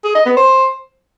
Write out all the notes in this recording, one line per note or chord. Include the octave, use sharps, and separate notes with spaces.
G#4
D#5
B3
C5